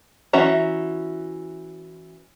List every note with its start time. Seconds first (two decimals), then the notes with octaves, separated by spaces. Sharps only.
0.33 E3 C#4 F#4 E5 A#5